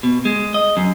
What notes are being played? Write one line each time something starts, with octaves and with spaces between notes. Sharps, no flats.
B2
G#3
D#5
F#2